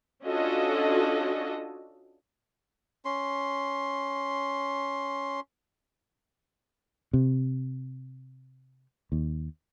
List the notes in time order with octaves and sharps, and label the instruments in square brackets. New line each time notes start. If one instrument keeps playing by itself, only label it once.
[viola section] C#4 D4 F4 F#4 A4 D#5
[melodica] C#4 C6
[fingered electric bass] C3
D#2